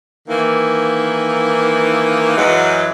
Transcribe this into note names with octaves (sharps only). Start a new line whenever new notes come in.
D#3 E3 A#3
F#2 E3 F#3 G#3